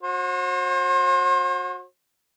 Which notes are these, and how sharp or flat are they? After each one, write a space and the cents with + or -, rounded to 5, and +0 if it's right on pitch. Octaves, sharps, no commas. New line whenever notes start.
F#4 -30 C5 +40